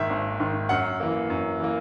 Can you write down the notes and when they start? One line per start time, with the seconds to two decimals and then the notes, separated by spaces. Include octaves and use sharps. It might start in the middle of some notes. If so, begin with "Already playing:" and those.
Already playing: G#1 G#2 D#3 E5
0.10 G#1
0.40 G#2 D#3
0.69 F#2 F#5
1.00 E3 A#3
1.30 F#2
1.60 E3 A#3